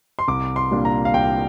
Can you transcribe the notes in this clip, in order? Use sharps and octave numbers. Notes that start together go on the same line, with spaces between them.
C6
C2 D6
C6
A#2 G3 A#3 D4
A#5
F5
C2 G5